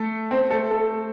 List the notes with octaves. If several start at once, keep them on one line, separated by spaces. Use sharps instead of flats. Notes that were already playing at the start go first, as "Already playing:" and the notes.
Already playing: A3 A4
C4 C5
A3 A4
A3 A4